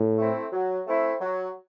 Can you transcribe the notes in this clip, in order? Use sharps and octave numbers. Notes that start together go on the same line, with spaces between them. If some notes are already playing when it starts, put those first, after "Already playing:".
Already playing: A2
A3 C4 E4
F#3
A3 C4 E4
F#3